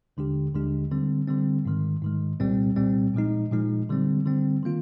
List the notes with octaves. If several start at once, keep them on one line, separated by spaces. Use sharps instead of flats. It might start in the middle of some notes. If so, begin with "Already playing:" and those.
D#2 D3 G#3 D4 G4
D#2 D3 G#3 D4 G4
D3 G3 C4
D3 G3 C4
G#2 D#3 G#3
G#2 D#3 G#3
C2 A#2 G3 C4
C2 A#2 G3 C4
A#2 F3 G#3 D#4
A#2 F3 G#3 D#4
D3 G3 C4
D3 G3 C4
D#3 A#3 F4